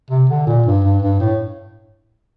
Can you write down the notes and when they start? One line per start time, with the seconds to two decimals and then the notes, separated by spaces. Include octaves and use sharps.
0.10 C3
0.29 D3
0.47 A#2
0.66 G2
0.84 G2
1.02 G2
1.20 A2